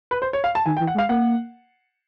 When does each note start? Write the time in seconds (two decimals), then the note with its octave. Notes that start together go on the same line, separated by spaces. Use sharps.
0.11 B4
0.22 C5
0.33 C#5
0.44 F5
0.55 A5
0.66 D#3 G#5
0.77 G5
0.80 E3
0.87 F#5
0.95 G#3
0.98 F5
1.09 A#3 F#5